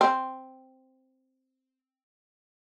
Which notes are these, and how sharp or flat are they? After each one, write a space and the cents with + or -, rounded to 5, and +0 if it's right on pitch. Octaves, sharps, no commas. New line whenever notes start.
C4 +0